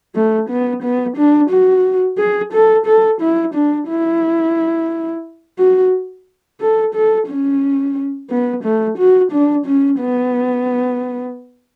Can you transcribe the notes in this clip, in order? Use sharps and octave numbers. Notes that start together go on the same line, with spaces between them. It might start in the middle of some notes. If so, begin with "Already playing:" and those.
A3
B3
B3
D4
F#4
G#4
A4
A4
E4
D4
E4
F#4
A4
A4
C#4
B3
A3
F#4
D4
C#4
B3